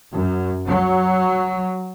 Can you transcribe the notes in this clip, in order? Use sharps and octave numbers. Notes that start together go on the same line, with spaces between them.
F#2
F#3